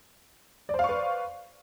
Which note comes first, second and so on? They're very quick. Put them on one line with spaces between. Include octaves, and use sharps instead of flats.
D5 C5 F5 C#6 B4